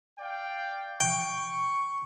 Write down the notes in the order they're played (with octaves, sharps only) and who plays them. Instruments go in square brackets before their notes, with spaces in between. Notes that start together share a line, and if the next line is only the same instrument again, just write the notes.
[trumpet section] D5 F5 G5
[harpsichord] G5 [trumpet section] C#6